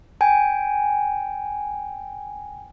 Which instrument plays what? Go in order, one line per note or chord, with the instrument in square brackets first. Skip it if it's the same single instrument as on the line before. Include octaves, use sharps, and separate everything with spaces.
[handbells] G5 G#5